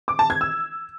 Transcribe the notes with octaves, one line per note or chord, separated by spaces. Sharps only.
D6
A5
G#6
E6